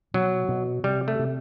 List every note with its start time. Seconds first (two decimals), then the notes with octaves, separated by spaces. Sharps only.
0.14 B2 F#3
0.49 B2
0.84 C3 G3
1.08 A3
1.19 C3